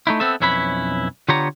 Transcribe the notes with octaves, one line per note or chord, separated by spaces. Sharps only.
A3 D#4 E4
B3 C4 A4 E5
B1 F2 C#4 E4 B4 B5
D3 B3 F4 G4 C#5 A#5